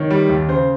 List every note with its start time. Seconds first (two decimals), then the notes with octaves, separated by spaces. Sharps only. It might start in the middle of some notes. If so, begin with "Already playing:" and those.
Already playing: D#3 C#5
0.10 G3
0.29 D#2
0.48 C#3 C5